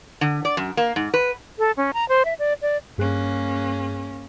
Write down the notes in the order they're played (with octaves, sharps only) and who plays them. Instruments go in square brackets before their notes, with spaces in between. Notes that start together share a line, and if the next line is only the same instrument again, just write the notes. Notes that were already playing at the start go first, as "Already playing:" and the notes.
[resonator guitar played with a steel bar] D3
D5
F#2
A#3
G#2
B4
[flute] A4
C#4
A#5
C5
E5
D5
D5
[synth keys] G2 G#4 F#6 [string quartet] A#3 C#4